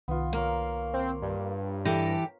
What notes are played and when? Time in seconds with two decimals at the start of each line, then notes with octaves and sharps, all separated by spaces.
0.08 C2 D#3 B3 F4
0.33 A#3 F4 A#4 C#5
0.93 C4
1.22 G2
1.85 E3 G4 A4 A#6